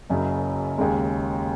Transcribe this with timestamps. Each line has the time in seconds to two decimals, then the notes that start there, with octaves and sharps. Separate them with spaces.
0.10 F#1 F#2 C#3
0.78 D#2 C#3 G#3